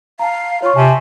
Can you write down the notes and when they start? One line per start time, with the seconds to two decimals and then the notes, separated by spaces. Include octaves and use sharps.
0.19 F5 A5 A#5
0.62 F4 C#5 C#6
0.76 C3 G#5 A5